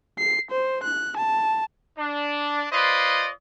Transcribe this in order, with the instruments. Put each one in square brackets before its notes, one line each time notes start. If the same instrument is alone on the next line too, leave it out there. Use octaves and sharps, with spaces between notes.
[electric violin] C7
C5
F#6
A5
[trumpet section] D4
F4 B4 C5 D5 D#5